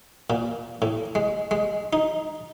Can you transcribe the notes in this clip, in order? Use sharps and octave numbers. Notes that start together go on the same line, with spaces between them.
A#2
A2
G#3
G#3
D#4